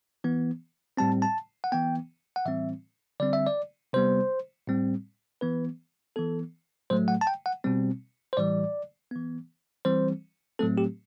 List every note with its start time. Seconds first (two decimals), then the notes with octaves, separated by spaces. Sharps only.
0.24 E3 B3
0.97 A2 G3 C4 A5
1.22 A5
1.64 F#5
1.72 E3 B3 G5
2.36 F#5
2.46 A2 E3 G3 C4 E5
3.20 D3 G3 C4 D5
3.33 E5
3.47 D5
3.93 C3 G3 B3 C5
4.67 A2 G3 C4
5.41 E3 B3 B4
6.16 E3 B3 A4
6.90 A2 F#3 A3 C5
7.08 F#5
7.21 A5
7.27 G5
7.46 F#5
7.64 B2 G3 C4
8.33 C5
8.37 A2 E3 G3 D5
9.11 E3 B3
9.85 E3 G3 C4 C5
10.59 A2 F#3 A3 C4 A4
10.78 G4